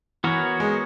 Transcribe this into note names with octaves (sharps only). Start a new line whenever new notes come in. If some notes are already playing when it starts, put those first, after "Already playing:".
E3 B3 F#4 A#4 C#5
G#3